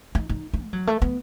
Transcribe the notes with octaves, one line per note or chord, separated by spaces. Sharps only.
D#4
D#4
D#4
G#3
F#3
A3
B3